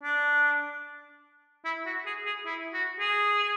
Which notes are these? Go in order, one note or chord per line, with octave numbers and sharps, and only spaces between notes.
D4
E4
F#4
G#4
G#4
E4
F#4
G#4